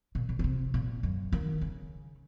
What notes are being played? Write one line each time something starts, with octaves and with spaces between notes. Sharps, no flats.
A#2
A#2
C#3
C3
A#2
F#2
D#3
C#3